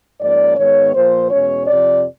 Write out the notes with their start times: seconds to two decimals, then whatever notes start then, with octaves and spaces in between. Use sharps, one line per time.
0.20 G#2 F3 A#3 C#4 D5
0.57 G#2 D#3 G#3 B3 C#5
0.94 A#2 F3 A#3 C5
1.31 E2 B2 G#3 C#4 C#5
1.68 F2 C3 F3 D5